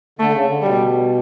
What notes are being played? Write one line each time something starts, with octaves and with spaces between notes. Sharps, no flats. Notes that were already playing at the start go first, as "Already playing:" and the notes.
D3 A3
C#3
D3
B2 G3